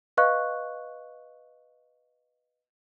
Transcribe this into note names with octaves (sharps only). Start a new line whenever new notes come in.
B4 D#5 F5 C#6 F#6